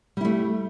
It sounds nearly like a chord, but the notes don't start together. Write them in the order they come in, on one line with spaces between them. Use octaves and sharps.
G3 E4 A3